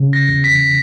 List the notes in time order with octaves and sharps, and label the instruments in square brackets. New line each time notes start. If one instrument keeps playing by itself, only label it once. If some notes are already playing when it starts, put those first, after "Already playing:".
Already playing: [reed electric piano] C#3
[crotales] A#6
[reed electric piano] E2
[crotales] B6